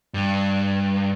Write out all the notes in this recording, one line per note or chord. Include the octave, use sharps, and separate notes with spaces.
G2